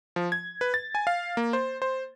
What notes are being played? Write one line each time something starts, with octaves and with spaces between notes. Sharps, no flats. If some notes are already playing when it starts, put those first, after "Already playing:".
F3
G#6
B4
A6
G#5
F5
A#3
C5
C5